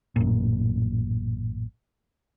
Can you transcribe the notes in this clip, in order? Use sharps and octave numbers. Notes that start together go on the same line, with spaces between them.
A1 F#2 A#2